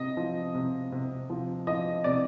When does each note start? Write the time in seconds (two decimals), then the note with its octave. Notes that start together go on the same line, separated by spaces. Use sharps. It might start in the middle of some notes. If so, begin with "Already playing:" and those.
Already playing: C3 D#5
0.17 F3
0.55 C3
0.92 C3
1.30 F3
1.67 F3 D#5
2.04 C3 D5